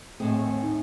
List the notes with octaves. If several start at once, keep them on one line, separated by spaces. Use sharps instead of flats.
D#2 A2 A3 C4 G#4
D#4